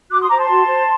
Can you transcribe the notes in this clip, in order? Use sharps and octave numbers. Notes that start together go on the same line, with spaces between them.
F#4 D6 F#6
C6 D#6
C5 A#5 D6
A5 C6
F#4
C5